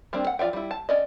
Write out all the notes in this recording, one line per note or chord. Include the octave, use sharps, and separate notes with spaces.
G3 A#3 C4 D4
F#5
F3 F4 D5 E5 G5
G3 E4
A5
C#4 D5 D#5